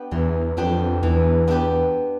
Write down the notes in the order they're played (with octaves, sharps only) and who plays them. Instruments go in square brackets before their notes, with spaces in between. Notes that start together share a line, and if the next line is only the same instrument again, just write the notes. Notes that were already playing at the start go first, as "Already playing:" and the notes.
Already playing: [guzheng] B3 D4 G4 B4
[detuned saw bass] E2 [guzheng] E3
[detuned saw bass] F2 [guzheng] B3 D4 G4 B4
[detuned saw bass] E2 [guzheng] E3
[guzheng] B3 D4 G4 B4